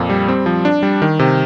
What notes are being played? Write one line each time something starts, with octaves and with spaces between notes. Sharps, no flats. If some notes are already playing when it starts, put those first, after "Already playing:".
Already playing: F2 A#2
G3
C4
F3
D4
G3
D#3
C3